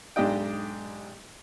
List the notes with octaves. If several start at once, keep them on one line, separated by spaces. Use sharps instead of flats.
B1 G#2 D4 G4 D#5 G5